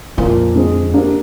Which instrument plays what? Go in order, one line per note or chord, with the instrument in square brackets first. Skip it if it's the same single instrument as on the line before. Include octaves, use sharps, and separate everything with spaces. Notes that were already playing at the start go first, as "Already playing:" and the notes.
[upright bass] F2 [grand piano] A#2 F3 A#3 F4
[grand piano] D3 G#3 C4
A#3 D4 G4